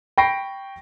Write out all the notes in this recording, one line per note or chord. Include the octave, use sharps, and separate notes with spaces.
G5 B5 C#6 A#6 C7 D7